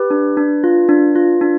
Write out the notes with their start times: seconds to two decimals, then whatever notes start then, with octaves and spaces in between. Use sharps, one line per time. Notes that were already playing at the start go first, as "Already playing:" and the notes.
Already playing: G4 B4
0.10 D4
0.37 D4
0.64 F4
0.89 D4
1.16 F4
1.41 D4